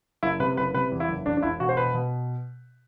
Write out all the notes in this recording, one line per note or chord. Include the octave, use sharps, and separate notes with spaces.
F#1 E4
C3 B4
F#1 B4
C3 B4
E2
E4
F#1
E1 D4
D4
E1 E4
B2 F#4
C5
B2 B4
B2